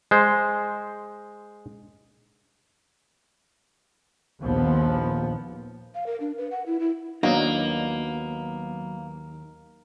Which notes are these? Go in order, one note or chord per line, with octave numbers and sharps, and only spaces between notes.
G#3 C5
A#1 D#2 F3 B3
F5
A#4
D4
B4
F#5
E4
E4
D#2 F#3 A#3 B3 D4 D#4